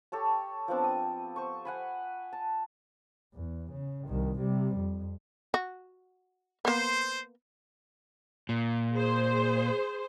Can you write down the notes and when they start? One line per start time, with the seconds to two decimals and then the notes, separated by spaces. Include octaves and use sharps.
0.12 G4 A4 C#5 A5
0.68 F3 B3 C4 D4
0.84 D#6
1.36 C5 C#6
1.65 F#5 G#5 B5
2.33 A5
3.34 E2
3.72 C#3
4.08 C2 D#3
4.38 C3 G3
4.76 F2
5.54 F#4
6.65 A#3 B3 C5
8.49 A#2
8.95 G#4 C5